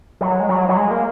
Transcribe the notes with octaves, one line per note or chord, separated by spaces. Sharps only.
F#3
G#3
F#3
F#3
G#3
A#3